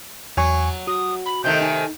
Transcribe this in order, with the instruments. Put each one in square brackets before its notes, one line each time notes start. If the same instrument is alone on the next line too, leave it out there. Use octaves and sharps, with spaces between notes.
[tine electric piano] E2 G#5 C#6 [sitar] F#3
[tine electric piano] F#4 [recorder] D#6
[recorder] B5
[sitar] C3 D#3 A3 [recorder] G6
[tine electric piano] D#4 [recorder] G#5